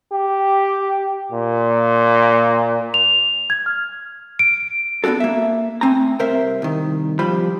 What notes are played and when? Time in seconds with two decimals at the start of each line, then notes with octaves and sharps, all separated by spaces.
0.12 G4
1.32 A#2
2.94 F7
3.50 G#6
3.66 F6
4.39 D7
5.04 B3 D4 F4 F#4 A4
5.20 A#3 E5
5.81 A3 C4 G#5 A#5
6.19 C2 A#4 C5 E5
6.62 C2 D#3
7.19 F3 G3 F4 C5 B5